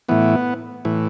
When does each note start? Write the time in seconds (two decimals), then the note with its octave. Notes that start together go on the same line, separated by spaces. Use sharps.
0.09 A2 E3 B3
0.85 A2 E3